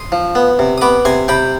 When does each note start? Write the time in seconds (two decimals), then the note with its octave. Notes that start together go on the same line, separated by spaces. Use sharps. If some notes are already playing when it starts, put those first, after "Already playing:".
Already playing: C6 D#6
0.12 F3
0.35 B3
0.59 C3
0.78 D#6
0.81 B3 B5 D6
1.05 C3 G#5 C6
1.28 C3 G5 B5